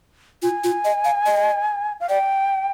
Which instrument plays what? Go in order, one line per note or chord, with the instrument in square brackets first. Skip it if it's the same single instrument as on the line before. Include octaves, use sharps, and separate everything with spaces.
[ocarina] F4 [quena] G#5
[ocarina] F4
D#5
F5
D#5
[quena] F5
[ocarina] D5 [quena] G5